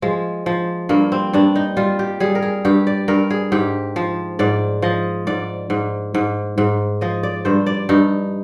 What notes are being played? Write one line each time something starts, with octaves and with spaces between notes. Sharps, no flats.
F3 G#3
F3
G2 A#3
C4
G2 D4
D#4
G3 F4
G4
G3 G#4
A#4
G#4
G2 G4
D5
G2 A#4
G#4
G#2 G4
F3
G#2 D5
F3 D#5
G#2 D5
G#2
G#2
G#2
F3 D#5
D5
G2 C5
D5
G2 D#4